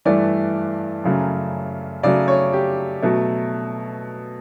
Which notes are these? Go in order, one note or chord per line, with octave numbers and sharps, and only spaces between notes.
G2 E3 A3 D5
F#2 C#3 F#3 A3
C#3 F#3 A3 D5
C#5
G4
B2 F#3 A3